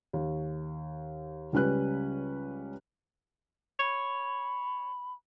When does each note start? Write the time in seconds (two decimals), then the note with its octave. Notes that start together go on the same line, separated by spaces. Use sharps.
0.13 D#2
1.53 C#2 G3 C#4 B4 F#6
3.79 C#5 B5